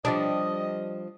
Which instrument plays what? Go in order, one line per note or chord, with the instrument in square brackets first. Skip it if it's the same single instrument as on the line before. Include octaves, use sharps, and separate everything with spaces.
[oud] F3 G3 D4 [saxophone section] D#5